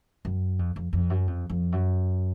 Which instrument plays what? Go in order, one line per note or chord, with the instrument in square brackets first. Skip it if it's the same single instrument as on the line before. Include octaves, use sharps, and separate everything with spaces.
[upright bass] F#2
F2
F2
F2
F#2
F2
F2
F#2